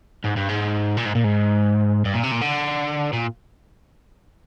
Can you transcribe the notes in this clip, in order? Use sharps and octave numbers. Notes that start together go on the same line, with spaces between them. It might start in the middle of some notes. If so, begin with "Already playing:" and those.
G#2
G2
G#2
A#2
G#2
A#2
G#2
G2
A#2
C3
A#2
D3
A#2